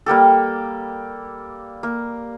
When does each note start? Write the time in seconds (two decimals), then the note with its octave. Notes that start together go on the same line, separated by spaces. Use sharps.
0.06 G3 A#3 G4 A4
1.83 A#3